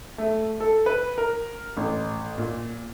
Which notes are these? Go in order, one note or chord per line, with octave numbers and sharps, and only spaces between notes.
A3
A4
B4
A#4
A1
A#2